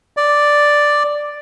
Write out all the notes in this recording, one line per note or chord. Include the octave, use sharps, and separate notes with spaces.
D5